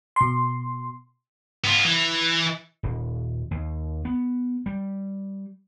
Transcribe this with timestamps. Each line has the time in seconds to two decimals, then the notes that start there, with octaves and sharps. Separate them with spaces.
0.16 B2 C6
1.64 B3 F4
1.85 E3
2.83 D#1
3.51 D#2
4.05 B3
4.66 G3